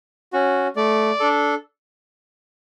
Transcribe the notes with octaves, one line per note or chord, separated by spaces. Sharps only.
C#4 F#4
A3 D5
D4 A4